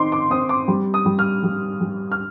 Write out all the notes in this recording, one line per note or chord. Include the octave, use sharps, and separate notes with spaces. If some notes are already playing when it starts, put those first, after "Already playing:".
Already playing: D#3 C4 D#4 C6 D6
D6
C4 D#6
D6
G3
D#6
G3
F6
G3
G3
F6